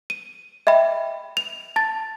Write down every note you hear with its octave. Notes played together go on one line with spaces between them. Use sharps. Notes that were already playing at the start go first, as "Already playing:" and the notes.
D#7
D#5 E5 G5 B5
F7
A5 A6